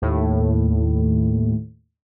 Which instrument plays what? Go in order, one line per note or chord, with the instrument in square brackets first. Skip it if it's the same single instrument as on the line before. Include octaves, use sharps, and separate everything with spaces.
[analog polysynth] D#2 A2